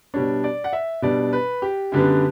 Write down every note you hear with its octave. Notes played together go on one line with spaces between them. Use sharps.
B2 G3 D4 C#5
D5
F#5
E5
B2 G3 D4 D5
B4
G4
F#2 D3 G3 B3